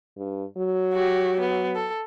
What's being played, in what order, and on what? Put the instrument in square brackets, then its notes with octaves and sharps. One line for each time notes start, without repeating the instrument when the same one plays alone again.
[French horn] G2
F#3
[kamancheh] F#4 G4
B3
A4